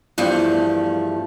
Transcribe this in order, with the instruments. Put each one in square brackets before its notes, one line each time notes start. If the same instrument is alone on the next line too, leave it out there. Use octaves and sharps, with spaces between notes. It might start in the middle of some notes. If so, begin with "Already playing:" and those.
[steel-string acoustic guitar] E2 G2 F3 A3